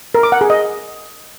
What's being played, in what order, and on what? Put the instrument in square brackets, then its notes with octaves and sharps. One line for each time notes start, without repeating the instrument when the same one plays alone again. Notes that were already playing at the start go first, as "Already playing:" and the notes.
[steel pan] A#4
D6
F#5
G#4
D#5